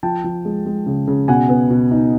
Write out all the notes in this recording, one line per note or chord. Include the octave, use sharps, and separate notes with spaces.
F3 G5 A5
F3
G#3
G#3
C#3
C#3
B2 F#5 G#5
B3
B2
D#4